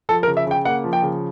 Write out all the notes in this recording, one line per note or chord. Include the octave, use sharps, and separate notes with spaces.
F3 A4
A#4
C#3
E5
C#3 G5
A#3 F#5
F3
G5
C#3